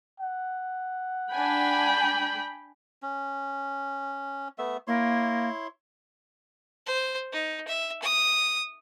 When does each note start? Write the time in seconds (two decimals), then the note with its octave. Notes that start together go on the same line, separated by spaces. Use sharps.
0.20 F#5
1.33 D4 G5 G#5 B5
3.02 C#4
4.58 A3 B3 E5
4.87 A#3 E4 C#5 C6
6.86 C5
7.33 D#4
7.68 E5
8.03 D#6